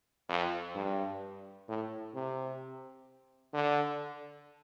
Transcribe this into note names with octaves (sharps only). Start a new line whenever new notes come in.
F2
G2
A2
C3
D3